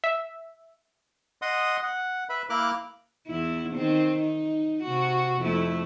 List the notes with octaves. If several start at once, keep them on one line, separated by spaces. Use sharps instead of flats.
E5
D#5 F#5 C6 D#6
F#5
B4 E5 B5
A#3 E4 A#4 D6 F6 F#6
E2 E4
D#3 C4
D#4
C3 F#4
F2 A3 E4